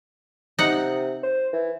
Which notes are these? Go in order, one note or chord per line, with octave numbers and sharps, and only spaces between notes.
C3 D#4 F#5
C5
E3